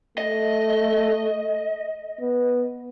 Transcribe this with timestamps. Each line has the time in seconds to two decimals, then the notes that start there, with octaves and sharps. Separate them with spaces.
0.18 A3 D#5
2.21 B3